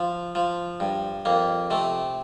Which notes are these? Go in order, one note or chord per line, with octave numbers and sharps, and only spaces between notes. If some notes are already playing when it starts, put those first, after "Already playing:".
Already playing: F3
F3
G2
F2 A#3
C3 A3